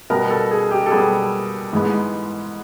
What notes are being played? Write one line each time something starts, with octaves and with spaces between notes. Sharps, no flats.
B2 G3 B3 A#4
A4
G#4
G4
A4
B2 G3 B3 G#4
G#2 E3 G#3 B3